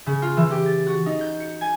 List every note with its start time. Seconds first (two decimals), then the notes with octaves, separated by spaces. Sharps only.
0.06 C#3
0.22 F4
0.37 E3
0.51 G4
0.66 A6
0.87 F#4
1.06 D#4
1.21 G6
1.40 C#7
1.61 G#5